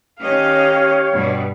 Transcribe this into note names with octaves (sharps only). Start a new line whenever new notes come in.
D#3 C#4 G4 C#5 D#5 F5
G2 B2 G3